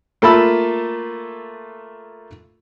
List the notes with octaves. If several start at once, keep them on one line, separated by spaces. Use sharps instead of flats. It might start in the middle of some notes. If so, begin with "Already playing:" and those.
A3 A#3 F4 A5 B5 E6